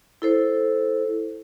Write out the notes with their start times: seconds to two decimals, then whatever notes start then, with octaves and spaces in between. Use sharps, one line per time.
0.22 E4 A4 C5